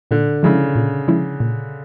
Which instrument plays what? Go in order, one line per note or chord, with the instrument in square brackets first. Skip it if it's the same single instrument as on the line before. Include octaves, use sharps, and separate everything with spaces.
[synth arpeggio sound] A#2 [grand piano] D3
[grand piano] C#3 [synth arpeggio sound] F3 G#3 C#4 E4
[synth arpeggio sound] A#2
F3 G#3 C#4 E4
A#2